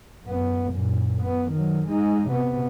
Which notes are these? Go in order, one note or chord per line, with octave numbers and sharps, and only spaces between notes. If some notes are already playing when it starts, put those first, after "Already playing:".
F#2 B3
F#2 A#2
B3
D#3 F#3
G#3 D#4
C3 B3